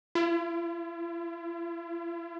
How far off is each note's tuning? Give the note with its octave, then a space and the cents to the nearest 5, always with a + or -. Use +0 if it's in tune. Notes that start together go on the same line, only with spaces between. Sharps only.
E4 +45